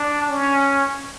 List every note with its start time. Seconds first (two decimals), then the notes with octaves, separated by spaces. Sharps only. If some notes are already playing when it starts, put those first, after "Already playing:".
Already playing: D4
0.29 C#4